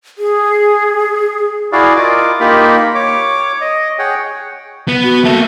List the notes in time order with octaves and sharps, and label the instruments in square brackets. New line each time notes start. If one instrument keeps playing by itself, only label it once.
[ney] G#4
[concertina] E4 F#4 G#4 D5 F5
F4 A#4 D#5 D6
A#3 D#4 F4 G4 A#4 B5
C#5 D6
D#5
G#4 C#5 F#5 G5
[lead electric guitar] B3
[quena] F#4
[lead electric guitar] A#3 A4 [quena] E5